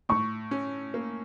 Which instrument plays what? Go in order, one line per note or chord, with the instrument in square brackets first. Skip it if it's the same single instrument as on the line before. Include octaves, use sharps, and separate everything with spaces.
[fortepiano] A2 [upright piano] C#6
[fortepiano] C#4
A#3